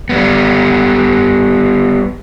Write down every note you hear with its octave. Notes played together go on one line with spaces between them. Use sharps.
G3 B3